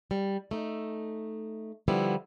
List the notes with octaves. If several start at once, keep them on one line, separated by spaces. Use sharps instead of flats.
G3
A3 D#4
D3 F3 G3 B3 E4